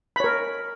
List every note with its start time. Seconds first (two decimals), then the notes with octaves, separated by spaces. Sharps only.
0.16 B5
0.20 C#5
0.24 A#4